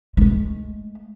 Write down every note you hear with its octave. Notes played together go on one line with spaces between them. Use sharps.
G#3 A3